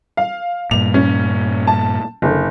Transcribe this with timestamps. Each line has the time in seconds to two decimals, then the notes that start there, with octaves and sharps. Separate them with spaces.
0.17 F5
0.71 G2 A#2 F7
0.94 C#4
1.67 A5
2.22 F#1 D3